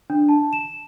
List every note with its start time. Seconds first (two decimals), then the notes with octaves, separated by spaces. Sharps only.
0.10 D4
0.29 A5
0.53 E7